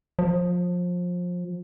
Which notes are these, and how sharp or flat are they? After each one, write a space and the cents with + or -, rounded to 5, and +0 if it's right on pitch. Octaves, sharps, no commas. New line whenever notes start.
F3 +25